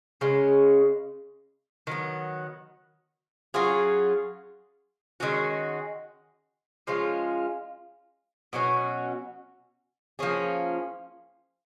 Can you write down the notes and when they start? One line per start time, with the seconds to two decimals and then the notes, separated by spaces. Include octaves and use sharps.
0.21 C#3 G#3 C#4
1.87 D#3 F#3 B3
3.54 F#3 C#4 F4 G#4
5.20 D#3 G#3 C#4 F#4
6.87 F3 G#3 C#4 F4
8.53 B2 F#3 C#4 F#4
10.19 F3 A#3 C#4 G#4